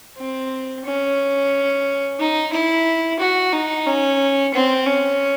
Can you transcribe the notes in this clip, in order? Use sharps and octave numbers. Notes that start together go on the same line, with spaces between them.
C4
C#4
D#4
E4
F#4
D#4
C#4
C4
C#4